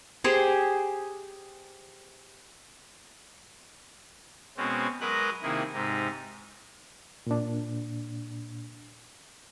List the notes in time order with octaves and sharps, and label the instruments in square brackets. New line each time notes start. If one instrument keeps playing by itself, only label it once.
[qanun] G4 G#4 C5
[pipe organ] B2 G#3 C4 C#4 F#4
F#3 G#3 A#4 B4 D#5 F#6
C3 D#3 A#3 E4 G#4
G#2 C3 D#4
[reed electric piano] A#2 D4